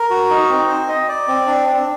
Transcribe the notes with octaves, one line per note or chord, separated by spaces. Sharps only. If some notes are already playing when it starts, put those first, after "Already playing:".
Already playing: A#4
F#4
D#4
C4
C5
D#5
D5
C4
D4
D4